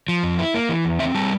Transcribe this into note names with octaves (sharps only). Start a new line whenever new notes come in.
F3
F2
E4
A#3
E3
E2
C4 E5
G3 A5